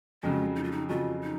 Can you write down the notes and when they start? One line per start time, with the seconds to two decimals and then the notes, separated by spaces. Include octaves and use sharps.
0.23 F2 C#3 F#3 G#3
0.56 D#4
0.64 F4
0.72 D#4
0.89 F2 C#3 F#3 F4
1.23 D#4